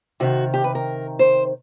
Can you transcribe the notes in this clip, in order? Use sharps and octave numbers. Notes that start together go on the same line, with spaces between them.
C3 D#3 F#4
G4
B4
A#4
C5